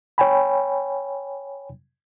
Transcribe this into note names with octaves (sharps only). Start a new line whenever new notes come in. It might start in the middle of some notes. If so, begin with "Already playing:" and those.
C#5 G5 G#5 B5